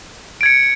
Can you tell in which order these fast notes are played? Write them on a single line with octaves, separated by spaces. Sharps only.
D7 G#6 C#7